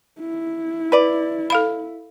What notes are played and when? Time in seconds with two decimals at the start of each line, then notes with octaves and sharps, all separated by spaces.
0.19 E4
0.92 B4 D5
1.50 A4 F5 B5